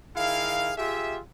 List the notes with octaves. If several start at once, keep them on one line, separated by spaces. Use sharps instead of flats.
D#3 E4 G#4 F5
F4 G4 G#4 E5